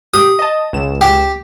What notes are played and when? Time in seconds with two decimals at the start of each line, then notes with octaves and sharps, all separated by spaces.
0.14 G4 D#6
0.39 D#5 A5
0.73 C#2 E7
1.01 G4